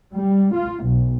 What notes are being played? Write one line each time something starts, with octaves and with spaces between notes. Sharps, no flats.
G3
F4
B1